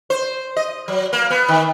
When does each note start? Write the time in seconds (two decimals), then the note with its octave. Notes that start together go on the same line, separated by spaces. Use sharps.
0.10 C5
0.56 D#5
0.88 F#3
1.13 A#3
1.30 B3
1.48 D#3